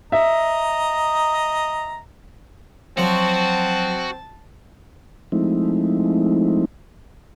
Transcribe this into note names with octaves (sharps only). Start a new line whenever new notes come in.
D#5 E5 A#5
F3 F#3 C4 F#4 C5 A5
F3 G#3 A3 C4 D#4 E4